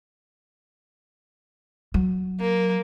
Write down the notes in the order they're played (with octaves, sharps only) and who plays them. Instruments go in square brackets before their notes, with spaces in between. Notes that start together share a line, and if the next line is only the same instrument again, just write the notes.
[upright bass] F#3
[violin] A#3